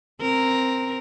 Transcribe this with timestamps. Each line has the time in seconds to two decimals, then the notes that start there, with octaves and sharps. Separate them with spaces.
0.21 C4 A#4